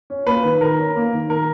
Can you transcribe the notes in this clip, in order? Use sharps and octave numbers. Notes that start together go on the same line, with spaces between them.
C#4
A#3 B4
D#3
D#3 A#4
C#4
A#3
D#3
D#3 A#4